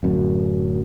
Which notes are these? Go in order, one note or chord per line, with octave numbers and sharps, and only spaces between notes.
D1 F#2